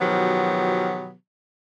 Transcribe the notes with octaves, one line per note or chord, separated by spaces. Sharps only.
B2 D#3 F3 F#3 B3 G4